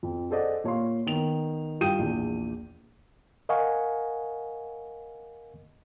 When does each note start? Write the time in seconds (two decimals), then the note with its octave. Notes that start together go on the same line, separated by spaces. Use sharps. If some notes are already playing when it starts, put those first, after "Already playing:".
0.03 F2
0.30 G#4 A4 C5 D5 D#5 F#5
0.64 A#2 C#5 F5 C6
1.07 D#3 B3 F7
1.81 G2 F4 G5 D#6 G6 D#7
1.99 A#1 E2
3.49 A#4 D#5 F5 F#5 G#5 C#6